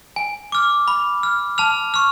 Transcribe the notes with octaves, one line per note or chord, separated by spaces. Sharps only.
G#5
D6 F6
B5
F6
A5 F6 F7
C#6 F6